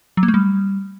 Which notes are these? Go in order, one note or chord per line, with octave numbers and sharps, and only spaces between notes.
F#3
A#3
A3
G3